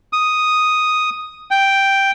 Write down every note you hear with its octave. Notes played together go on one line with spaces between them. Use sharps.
D#6
G5